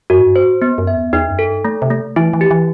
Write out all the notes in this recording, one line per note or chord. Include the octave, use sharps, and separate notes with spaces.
F#2 F#4
A2
G2
C5
A2
B3
F#2
E5
E2
E2 D#4
F#2
A4
G2
A3
C3
A3
E3 E4
E3
G4
E3